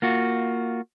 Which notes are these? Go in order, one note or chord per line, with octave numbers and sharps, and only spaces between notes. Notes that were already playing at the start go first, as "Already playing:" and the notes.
A#3 F4 F#4